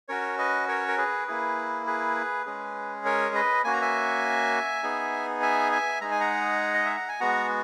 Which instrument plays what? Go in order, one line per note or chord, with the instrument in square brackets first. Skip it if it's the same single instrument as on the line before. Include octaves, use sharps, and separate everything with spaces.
[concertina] C#4 F#4 A#4 C#5
B4 D#5
A#4 C#5
A#4
G#4 B4
A#3 E4 G#4
G#4 B4
G#3 C#4 G#4
A#4 C#5
B4 D#5
A#3 C#4 F#4 G#5
A#5
E5 G#5
B3 D#4 G#4
E5 G#5
E5 G#5
G#3 D#4 G#4 A#5
G#5
F#5 A#5
D#5
E5
F#5
G#5
G#3 B3 F#4 F#5 A#5